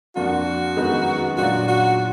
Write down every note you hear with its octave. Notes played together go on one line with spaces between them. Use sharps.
F2 F3 A#3 D4 F4 F#4
F#2 D#3 G#3 B3 D#4
A#2 F#3 D4 F4 F#4
F#4